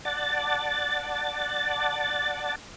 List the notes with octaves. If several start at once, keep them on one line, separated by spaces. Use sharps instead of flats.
D5 F#5 A5 A6